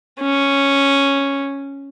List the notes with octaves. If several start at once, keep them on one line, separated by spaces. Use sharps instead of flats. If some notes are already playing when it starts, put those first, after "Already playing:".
C#4